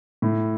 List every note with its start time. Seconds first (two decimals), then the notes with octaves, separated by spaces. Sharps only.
0.22 A2